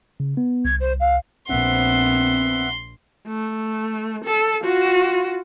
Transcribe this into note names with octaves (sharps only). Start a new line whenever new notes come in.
C#3
B3
C2 G#6
C5
F5
A#1 B3 C4 E5 F#5 C6
A3
A4
F4 F#4